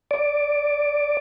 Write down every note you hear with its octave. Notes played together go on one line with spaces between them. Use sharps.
D5